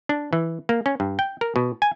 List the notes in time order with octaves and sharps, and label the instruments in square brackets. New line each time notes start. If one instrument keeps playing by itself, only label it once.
[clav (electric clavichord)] D4
E3
A#3
C#4
G2
G5
A#4
B2
G#5